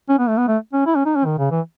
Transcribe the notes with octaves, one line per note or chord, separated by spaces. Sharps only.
C#4
B3
A3
B3
A3
C#4
E4
C#4
D#4
C#4
D#3
C#3
E3